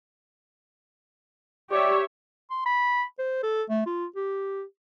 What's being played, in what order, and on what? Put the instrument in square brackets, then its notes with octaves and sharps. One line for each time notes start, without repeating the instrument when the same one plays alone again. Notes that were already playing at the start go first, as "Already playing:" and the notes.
[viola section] G4 C#5 E5 [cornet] D5
[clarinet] C6
B5
C5
A4
A3
F4
G4